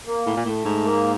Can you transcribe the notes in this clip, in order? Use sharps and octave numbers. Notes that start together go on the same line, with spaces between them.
A#3
A2
A#2
A2 A3
G#2
A#3